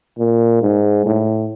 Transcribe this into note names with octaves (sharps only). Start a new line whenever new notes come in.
A#2
G#2
A2